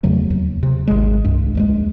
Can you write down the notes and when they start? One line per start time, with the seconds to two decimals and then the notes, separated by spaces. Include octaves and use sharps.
0.03 E2 C#3 F#3 A3
0.30 D#2
0.63 C3
0.88 G#1 G#3
1.24 C2 G2
1.55 D#2 G3 G#3